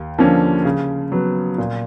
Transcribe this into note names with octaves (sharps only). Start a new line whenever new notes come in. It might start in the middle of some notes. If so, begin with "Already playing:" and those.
Already playing: D#2
D3 F3 A#3 C#4
C#3
F#3 B3
A#2